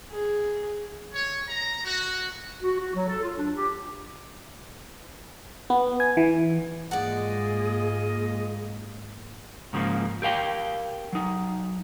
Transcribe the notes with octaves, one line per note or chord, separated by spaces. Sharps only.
G#4
C#5
A#5
F#4
F#4
F#4
F#3
A4
F4
D4
G4
B3
G#5
E3
G#2 G#3 A#3 F4 G#4 D5 D#5 F#5
G#2 C#3 F3 G#3 A#3
G4 A#4 F5 G5
F#3 D#4